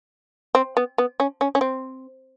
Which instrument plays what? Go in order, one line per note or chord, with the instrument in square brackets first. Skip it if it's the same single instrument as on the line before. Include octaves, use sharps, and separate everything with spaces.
[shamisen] C4
B3
B3
C#4
C#4
C#4
C4